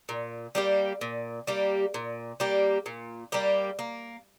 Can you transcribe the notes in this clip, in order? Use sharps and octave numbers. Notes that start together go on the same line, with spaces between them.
A#2
G3 A#3 G4
A#2
G3 A#3 G4
A#2
G3 A#3 G4
A#2
G3 A#3 G4
A#3